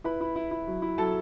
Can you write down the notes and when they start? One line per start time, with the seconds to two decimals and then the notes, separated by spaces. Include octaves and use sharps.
0.04 E4 B4 B5
0.21 E4
0.36 E4
0.51 E4
0.67 F#3
0.82 E4
0.98 F#3 A4 A5